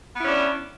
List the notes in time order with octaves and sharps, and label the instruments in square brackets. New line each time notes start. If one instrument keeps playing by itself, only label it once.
[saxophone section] B3
E4
C#4
D4